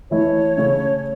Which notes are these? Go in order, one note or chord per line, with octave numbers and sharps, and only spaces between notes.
E3 A3 E4 C#5
C#3 A3 C#4